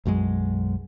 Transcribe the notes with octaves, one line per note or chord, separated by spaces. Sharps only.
B1 F#2 F#3 G#3